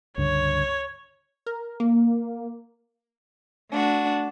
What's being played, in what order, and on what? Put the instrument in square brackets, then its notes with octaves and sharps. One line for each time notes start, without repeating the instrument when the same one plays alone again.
[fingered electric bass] C#2 G2 D3 [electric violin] C#5
[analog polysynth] A#4
A#3
[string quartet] A3 D4 F#4